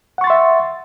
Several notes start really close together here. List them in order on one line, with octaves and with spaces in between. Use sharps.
F#5 C#6 A6 C6 E5